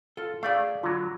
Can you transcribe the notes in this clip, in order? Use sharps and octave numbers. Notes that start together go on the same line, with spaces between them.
F4 A4
A3 G#4 D5 F5
D3 F#3 F4